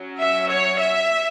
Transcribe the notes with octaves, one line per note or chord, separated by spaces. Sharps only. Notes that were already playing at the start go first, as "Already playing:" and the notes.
Already playing: F#3 C#4
E5
C#5
E5